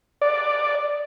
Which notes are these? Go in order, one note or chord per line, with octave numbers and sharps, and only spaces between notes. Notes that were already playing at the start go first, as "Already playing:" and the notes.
D5